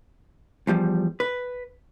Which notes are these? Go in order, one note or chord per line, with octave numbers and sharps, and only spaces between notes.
E2 F3 G3
B4